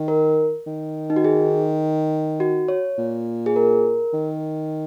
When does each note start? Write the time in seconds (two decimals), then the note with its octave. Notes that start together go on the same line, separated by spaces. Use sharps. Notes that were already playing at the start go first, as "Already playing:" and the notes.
Already playing: D#3
0.08 A#4
0.66 D#3
1.10 D#4
1.16 F#4
1.25 G#4
2.40 F#4
2.68 C#5
2.98 A#2
3.46 G#4
3.56 A#4
4.14 D#3